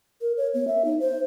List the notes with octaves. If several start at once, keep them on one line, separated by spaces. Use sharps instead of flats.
A#4
C#5
B3
E5
D#4
C5